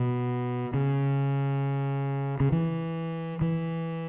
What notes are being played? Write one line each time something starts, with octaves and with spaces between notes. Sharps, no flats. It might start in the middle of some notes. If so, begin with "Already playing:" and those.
Already playing: B2
C#3
C#3
E3
E3